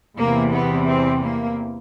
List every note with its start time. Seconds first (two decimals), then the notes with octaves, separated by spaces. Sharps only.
0.17 E2 C3 E3 A#3
0.53 B3
0.87 C4
1.23 A#3